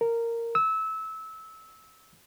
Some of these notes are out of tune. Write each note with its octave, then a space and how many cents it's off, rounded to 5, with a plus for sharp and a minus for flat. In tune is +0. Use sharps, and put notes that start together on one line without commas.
A#4 -10
E6 -20